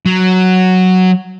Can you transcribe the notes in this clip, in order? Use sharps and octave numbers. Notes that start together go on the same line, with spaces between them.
F#3